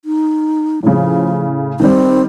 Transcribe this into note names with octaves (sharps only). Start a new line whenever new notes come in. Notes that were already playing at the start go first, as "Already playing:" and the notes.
D#4
A2 C#3 F3
D#3 G3 C4